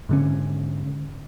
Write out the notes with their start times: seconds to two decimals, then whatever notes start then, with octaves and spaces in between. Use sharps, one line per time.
0.09 G#2 D3 C#4